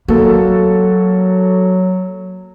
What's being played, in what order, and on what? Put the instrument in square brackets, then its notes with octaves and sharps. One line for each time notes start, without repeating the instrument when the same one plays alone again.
[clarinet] F#3 [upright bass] A#3 [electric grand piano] F#4 A4 A#4